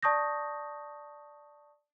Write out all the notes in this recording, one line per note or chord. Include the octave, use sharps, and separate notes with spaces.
D5 A5 C#6 D#6 G6 A#6